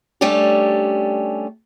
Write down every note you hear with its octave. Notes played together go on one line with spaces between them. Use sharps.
G3 A3 C#4 D4 G4